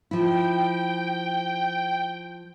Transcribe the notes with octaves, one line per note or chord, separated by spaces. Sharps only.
F3 E4 G5